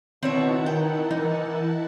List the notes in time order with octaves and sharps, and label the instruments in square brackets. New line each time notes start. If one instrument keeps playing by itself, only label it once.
[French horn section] B2 [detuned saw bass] D#3 [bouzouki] C4 C#5 E5 [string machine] E4 F#5 A5
[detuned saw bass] D#4 [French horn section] A#4 [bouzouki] G5
[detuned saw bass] E3 [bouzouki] D#4